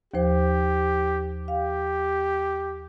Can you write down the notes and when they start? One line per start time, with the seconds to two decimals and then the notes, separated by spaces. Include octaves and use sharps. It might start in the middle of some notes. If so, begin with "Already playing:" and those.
0.14 D#2 F3 G4 C5
1.48 G4 F5